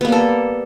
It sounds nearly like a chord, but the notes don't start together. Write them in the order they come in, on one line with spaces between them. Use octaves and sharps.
B3 A#3 G3 A4